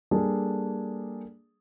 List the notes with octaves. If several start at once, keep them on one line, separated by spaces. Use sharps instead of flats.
G3 A#3 D4 G#4 A4